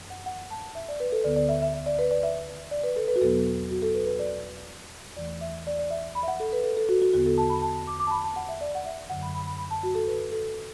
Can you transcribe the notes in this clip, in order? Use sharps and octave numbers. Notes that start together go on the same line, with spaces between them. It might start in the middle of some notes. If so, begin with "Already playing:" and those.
Already playing: F#2 E3
F#5
F#5
A5
E5
D5
B4
A4
D2 D3 B3 D5
D5
E5
E5
E5
D5
B4
D5
E5
D5
B4
A4
B4
F#4
E2 B2 F#3 B3 A4
F#4
A4
B4
B4
D5
E2 E3 A3 D5
E5
D5
D5
E5
B5
E5
F#5
A4
B4
A4
A4
F#4
F#4
E2 D3 B3 F#4
A4
A5
B5
A5
D6
D6
A5
B5
A5
F#5
E5
D5
F#5
E5
F#2 D3 F#3 F#5
B5
B5
B5
B5
A5
F#4
A4
B4
A4